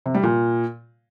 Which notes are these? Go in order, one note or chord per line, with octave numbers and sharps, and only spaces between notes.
C3
G3
A#2